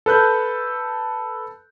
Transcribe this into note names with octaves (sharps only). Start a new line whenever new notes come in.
A4 B4 F#6 G6